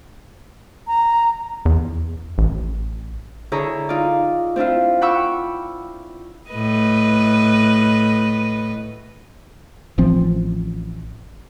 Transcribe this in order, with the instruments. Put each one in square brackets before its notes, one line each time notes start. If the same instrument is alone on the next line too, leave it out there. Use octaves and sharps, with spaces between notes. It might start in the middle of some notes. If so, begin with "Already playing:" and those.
[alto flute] A#5
[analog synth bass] E2
A1
[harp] D3 E4 G#4 A4 C#5 A#5
D#4 F4 D5
C4 D4 E4 F4
F#5 G5 B5 C#6 D6 E6
[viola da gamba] A2 B4 D#5
[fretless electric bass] A1 E3 F3 C4